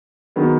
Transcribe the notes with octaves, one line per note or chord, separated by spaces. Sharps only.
D#3 F#3 B3 G#4